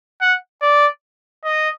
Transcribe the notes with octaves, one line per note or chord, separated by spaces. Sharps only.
F#5
D5
D#5